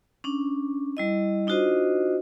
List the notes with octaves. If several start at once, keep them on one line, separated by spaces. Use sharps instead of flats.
C#4 D4
G3 E4 D#5
D4 D#4 F4 F#4 C5 D#5